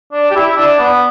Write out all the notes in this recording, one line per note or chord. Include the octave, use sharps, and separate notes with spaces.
D4
G4
E4
D4
B3